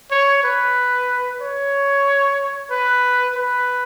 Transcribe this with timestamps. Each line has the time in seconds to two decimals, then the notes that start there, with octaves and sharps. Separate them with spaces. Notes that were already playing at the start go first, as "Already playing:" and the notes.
0.11 C#5
0.44 B4
1.41 C#5
2.71 B4
3.36 B4